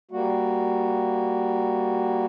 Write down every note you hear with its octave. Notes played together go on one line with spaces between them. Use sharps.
G3 A#3 F#4